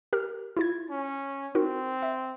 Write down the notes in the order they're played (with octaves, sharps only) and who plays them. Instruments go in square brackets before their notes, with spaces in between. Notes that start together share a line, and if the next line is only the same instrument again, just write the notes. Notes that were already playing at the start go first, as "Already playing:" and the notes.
[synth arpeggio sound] G4 A#4 F6
E4 F4 G#6
[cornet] C#4
[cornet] C4 [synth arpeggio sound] D#4 F#4 A#4
[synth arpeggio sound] E5